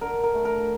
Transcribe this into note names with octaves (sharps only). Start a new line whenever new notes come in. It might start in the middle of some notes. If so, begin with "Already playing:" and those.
D3 A#4
A#4
A3
A#4